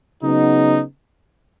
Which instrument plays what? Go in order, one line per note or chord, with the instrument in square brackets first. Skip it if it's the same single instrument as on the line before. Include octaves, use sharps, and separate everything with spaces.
[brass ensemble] C#3 F#3 B3 D#4